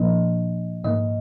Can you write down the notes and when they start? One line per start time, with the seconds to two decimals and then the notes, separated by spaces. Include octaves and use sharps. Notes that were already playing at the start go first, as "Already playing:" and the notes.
Already playing: A#2 F3 A#3 D4 D#5
0.84 G#2 D#3 A#3 D#5